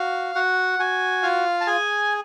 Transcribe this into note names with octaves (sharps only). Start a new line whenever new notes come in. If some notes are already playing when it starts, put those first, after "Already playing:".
Already playing: F#4 F5
F#4 F#5
F#4 G#5
F4 F5
A5
G#4 G#5